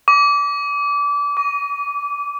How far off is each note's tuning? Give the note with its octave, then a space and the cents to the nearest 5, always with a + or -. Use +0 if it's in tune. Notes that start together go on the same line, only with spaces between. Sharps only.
D6 -25
D6 -45